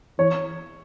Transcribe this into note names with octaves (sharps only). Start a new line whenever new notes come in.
E3 C#5